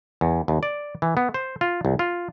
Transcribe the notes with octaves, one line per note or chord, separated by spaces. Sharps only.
E2
D#2
D5
E3
B3
C5
F4
C2
F4